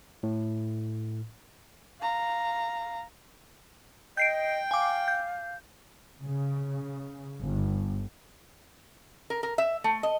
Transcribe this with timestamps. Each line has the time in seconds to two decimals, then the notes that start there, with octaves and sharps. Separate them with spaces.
0.23 A2
2.01 F5 A#5
4.17 D#5 G5 G6 C7 D7
4.71 F5 G#5 D6
5.08 G6
6.23 C#3
7.40 G1
9.30 A#4
9.43 A#4
9.58 E5
9.84 A3
10.03 D#5